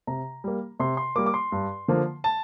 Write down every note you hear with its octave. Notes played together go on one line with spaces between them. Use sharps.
C3 A#5
G3 A#3
C3 C6
C6
G3 A#3 D6
D6
C6
G2
D3 F3 A#3
A5